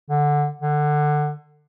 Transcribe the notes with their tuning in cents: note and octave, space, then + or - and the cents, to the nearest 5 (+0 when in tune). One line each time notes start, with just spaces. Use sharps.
D3 +5
D3 +20